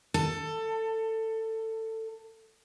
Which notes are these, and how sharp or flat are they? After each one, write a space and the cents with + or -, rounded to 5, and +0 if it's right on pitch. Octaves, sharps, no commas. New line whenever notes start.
A4 +20